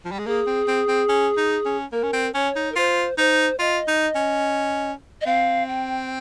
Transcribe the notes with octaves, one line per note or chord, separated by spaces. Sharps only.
F3
G3
G#3
A#3 G#4
C4
C4
C4
C#4
D#4
C#4
A#3 A#4
C#4
C4
C#4 C#5
D#4
A#4
F4 C5
D#4 C5
F4 D#5
D#4
C#4
D#5
C4 F5
G5